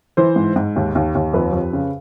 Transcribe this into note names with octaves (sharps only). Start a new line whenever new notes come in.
E3 C5
G#2
G#2
D#2
D#2
D#2
F2 B4
F2
C#3